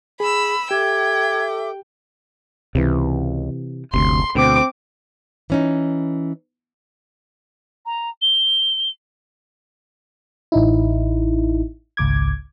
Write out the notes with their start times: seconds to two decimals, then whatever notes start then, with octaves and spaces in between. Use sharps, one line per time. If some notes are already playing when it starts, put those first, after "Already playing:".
0.20 G#4 B5 E6
0.71 G4 A4 E5 G5 D6 G#6
2.75 C#2 C3 E3
3.94 F#1 D2 C3 C6
4.35 D2 B2 C4 D6
5.50 E3 C#4 D#4
7.86 A#5
8.22 G7
10.52 A1 D#4 E4
11.97 G#1 C#2 D6 G#6